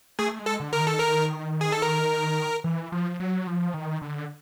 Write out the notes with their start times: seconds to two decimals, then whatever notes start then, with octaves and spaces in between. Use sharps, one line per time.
0.19 A3 G#4
0.39 G#3
0.46 A4
0.60 D3
0.73 A#4
0.80 D#3
0.87 A4
0.99 A#4
1.61 G#4
1.72 A4
1.82 A#4
2.64 E3
2.92 F3
3.20 F#3
3.47 F3
3.74 D#3
4.02 D3